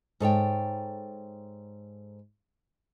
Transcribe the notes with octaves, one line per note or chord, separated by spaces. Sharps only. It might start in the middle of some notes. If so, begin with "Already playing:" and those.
G#2 A4 C#5 G5